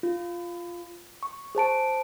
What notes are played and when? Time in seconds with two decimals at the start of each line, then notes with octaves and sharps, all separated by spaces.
0.03 F4
1.23 C#6
1.55 G#4 C5 A5 D7